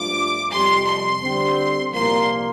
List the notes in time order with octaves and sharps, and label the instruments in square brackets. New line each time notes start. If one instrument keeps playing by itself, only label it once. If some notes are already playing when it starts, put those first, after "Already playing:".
Already playing: [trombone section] G2 F3 A3 D4 F4 [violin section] D6
[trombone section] F2 C3 G3 C4 [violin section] C6
[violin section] C6
[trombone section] D3 G3 C4
[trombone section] C2 A#2 F3 A#3 [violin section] C6